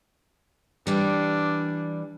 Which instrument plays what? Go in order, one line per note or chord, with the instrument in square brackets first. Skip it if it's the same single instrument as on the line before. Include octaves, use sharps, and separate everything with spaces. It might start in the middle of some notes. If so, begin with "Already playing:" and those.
[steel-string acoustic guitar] E3 G3 [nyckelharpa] D4